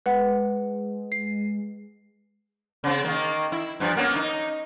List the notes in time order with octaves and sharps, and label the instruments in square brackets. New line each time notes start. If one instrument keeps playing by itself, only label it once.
[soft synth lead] G#3 [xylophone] B4 F#5
[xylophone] C7
[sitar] C#3 C4
D#3 A#3
E4
G2 F3
A#3 B3 C#4
D#4